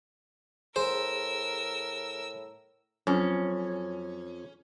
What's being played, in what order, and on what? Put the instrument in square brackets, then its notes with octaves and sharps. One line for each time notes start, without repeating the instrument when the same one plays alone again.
[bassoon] A2 [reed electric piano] G#4 [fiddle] A#4 E6 [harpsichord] C5
[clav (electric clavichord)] F2 [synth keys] F#3 [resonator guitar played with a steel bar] C#4